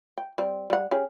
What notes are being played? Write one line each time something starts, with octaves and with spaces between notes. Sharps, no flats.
G5
G3 C4
G3 F#5
C#4 G4 G#4